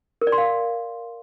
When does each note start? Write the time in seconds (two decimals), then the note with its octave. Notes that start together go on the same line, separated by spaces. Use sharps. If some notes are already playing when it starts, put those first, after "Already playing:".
0.21 A#4
0.27 D5
0.32 C6
0.38 F5